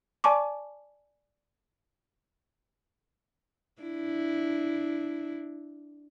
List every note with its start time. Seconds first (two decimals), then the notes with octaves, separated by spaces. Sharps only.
0.24 D5 G#5 A5 C#6 D6
3.82 D4 E4